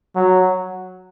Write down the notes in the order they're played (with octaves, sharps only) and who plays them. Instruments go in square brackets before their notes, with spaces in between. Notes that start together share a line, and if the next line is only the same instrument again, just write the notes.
[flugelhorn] F#3